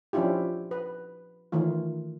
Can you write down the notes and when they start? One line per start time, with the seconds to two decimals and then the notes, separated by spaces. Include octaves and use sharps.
0.13 F3 C#4 D4 E4 F4 G4
0.71 B4
1.52 D#3 E3 A3 F4